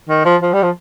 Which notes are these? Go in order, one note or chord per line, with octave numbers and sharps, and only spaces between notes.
D#3
F3
F3
G3
F3